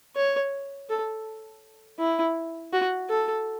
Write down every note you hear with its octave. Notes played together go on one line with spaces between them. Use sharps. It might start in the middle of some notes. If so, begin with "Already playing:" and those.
C#5
A4
E4
F#4
A4